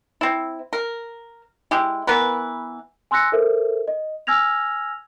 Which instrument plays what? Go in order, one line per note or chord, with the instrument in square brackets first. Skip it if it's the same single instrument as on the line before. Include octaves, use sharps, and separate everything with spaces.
[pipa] C4 E4
A#4
G#3 E4 G4
E3 B3 A#4 B4
[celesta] G#5 C6 E6 F#6 A#6 C#7
A4 A#4 C5 E5
D#5
G#5 E6 F6 G#6 A#6 F7